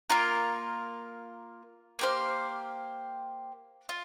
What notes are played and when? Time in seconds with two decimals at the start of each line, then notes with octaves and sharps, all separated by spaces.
0.10 A#3 F4 A#4
1.99 A#3 G4 C5 F5
3.89 F4